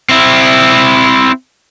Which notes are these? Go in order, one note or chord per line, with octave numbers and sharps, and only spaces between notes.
C4 E4